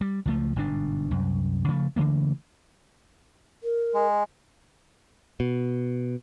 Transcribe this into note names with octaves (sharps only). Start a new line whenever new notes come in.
G3
C#2 F3 A3
G1 G#2 B2 D4
C2 F#2
C#3 F3 A3
C#3 E3 A3 A#3
A#4
G#3
B2